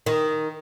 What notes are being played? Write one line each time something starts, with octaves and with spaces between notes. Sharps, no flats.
D#3